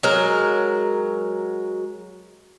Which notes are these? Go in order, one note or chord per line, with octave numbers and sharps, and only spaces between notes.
F#3 G#3 A#4